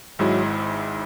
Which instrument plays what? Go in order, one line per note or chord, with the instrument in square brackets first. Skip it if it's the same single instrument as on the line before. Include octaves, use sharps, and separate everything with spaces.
[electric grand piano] G#1 G#2 G#3 E4 [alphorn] F#3